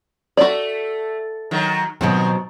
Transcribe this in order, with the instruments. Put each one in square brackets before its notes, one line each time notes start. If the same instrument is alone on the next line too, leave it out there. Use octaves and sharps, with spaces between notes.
[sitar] A3 [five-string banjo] F#4 D5
[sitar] D#3 F#3
[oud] B2 F#3 C4 [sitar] D#3